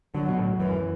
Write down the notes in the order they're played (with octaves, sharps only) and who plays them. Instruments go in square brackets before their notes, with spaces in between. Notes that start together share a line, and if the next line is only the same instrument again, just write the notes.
[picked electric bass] D3 [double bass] F#3
[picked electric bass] B2
A2
[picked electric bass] F#2 [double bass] E3